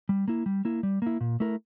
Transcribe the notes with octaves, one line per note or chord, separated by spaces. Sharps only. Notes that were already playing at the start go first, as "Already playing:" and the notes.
G3
A#3 E4
G3
A#3 E4
G3
A#3 E4
A#2
A3 E4 A#4